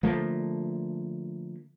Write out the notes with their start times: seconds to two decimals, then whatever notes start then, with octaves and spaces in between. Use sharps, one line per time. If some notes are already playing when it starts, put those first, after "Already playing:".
0.03 D3 F3 A3 A#3